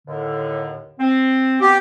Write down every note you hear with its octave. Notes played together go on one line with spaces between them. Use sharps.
D#2 A2 D3
C4
B3 G4